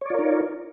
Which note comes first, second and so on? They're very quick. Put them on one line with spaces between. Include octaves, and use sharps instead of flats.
C#5 D5 F4 A#4 D#4